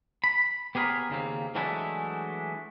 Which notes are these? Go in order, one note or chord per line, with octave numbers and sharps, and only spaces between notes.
B5
B3 G4 G#4 A#4 C#5 B5
D#2 C#3 A#3 C4
E3 F#3 G#3 A3 D4 E4